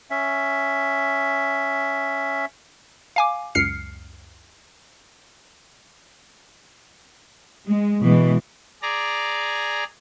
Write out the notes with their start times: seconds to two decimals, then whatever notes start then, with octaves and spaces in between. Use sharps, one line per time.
0.11 C#4 E5
3.16 F5 G#5 D6
3.55 C#2 F#2 F6 C7 C#7
7.66 G#3
8.05 B2 E3 G#3
8.82 G#4 D5 A#5